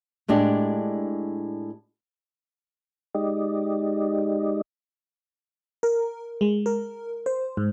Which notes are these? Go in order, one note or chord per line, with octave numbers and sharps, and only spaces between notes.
A2 G#3 D4 G4
G#3 D#4 G4 D5 D#5
A#4
G#3
A#4
C5
G#2